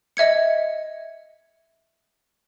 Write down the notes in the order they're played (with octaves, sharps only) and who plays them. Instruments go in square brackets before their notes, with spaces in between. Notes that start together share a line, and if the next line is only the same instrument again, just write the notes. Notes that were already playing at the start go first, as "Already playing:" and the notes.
[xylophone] D#5 E5 G#6 C#7